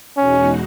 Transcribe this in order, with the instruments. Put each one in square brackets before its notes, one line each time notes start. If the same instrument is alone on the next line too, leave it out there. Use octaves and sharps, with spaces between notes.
[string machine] E2 B2 G#3 D#4 F#4 [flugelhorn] C#4